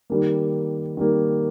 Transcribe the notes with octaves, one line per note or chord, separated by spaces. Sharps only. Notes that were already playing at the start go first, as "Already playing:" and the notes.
D#3 G3 A#3
D#3 G3 A#3